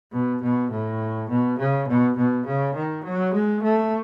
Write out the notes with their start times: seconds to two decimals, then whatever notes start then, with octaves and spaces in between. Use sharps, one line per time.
0.13 B2
0.42 B2
0.71 A2
1.30 B2
1.58 C#3
1.88 B2
2.17 B2
2.46 C#3
2.75 D#3
3.04 F#3
3.34 G#3
3.63 A3